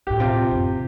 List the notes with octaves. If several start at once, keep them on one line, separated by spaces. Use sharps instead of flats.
D#2 A2 G4
C3 F4
F#2 D#3